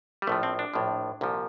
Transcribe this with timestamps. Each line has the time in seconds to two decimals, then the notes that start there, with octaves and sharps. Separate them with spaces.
0.22 G3
0.27 A#1 A2 F3 A3
0.43 C4
0.59 D4
0.74 A#1 A2 F3
1.21 C2 A#2 F3